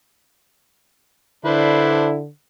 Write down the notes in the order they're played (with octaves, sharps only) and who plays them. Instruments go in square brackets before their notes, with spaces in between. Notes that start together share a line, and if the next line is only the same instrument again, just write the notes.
[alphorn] D3 [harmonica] D4 B4 C5 [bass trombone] E4